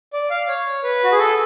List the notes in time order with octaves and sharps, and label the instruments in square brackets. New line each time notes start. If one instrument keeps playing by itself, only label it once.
[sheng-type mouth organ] D5
F5
C#5
B4
F#4
G#4
A4